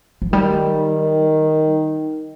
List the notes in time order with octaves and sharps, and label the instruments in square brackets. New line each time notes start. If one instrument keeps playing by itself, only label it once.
[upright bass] F3
[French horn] D#3 [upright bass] G3